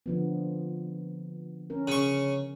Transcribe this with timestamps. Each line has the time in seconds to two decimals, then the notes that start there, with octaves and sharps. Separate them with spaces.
0.06 D3 F3 B3
1.70 C#4 A#4
1.88 C#3 C#6